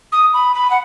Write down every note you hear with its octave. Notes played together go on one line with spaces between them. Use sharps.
D#6
B5
B5
F#5